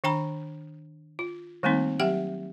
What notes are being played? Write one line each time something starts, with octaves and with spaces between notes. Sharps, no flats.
D#3 D4 G5 A#5 B5
F4
D#3 G3 A3 A#3 C4 D#4
F#3 G4 E5 F#5 G5